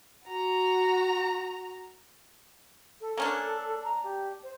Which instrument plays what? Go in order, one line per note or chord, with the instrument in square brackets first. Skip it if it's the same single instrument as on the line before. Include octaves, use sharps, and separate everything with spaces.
[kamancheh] F#4 A#5
[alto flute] A4
[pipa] A#3 C#4 D4
[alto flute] A#5
G4
C5